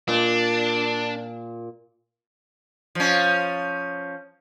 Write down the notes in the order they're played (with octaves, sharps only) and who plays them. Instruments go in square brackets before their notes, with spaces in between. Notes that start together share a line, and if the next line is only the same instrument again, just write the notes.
[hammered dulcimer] A#2 [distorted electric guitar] D4
[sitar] F3 C#4